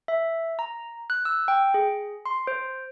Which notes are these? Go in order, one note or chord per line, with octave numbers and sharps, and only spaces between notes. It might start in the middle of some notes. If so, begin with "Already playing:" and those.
E5
A#5
F#6
E6
G5
G#4
C6
C5